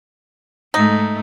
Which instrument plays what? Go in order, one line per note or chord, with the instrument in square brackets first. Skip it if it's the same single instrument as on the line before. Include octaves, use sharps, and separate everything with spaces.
[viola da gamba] G#2 A3 [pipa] D#4